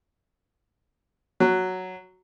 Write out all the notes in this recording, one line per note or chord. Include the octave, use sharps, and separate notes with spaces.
F#3